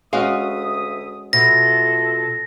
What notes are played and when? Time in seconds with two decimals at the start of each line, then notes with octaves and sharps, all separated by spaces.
0.13 D2 G#3 C#4 F#4 E5 F5 D#6
1.33 B2 A3 F4 A4 A#6